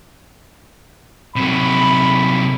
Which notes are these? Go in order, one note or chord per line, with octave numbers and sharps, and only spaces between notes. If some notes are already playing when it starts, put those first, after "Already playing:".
C3 F#3 B5